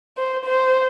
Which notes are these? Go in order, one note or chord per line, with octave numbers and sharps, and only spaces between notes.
C5
C5